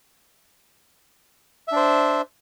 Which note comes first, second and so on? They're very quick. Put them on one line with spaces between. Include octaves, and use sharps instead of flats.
E5 D4 C5